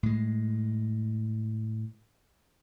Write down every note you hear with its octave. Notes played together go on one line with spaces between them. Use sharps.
A2 G#3